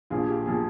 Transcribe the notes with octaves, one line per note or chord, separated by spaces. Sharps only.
A#1 A#2 F3 G#4
G4
A#2 F3 G#4